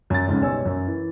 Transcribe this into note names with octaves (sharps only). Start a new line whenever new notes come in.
F#2 A6
F2 G#2 C#3 C#4 D#4
B1 G3 C#5 G#5 E6
F#2 C#4
E3